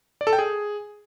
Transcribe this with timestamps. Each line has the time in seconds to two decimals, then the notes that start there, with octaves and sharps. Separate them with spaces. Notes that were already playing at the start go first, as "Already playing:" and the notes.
0.21 D5
0.27 A4
0.33 G5
0.39 G#4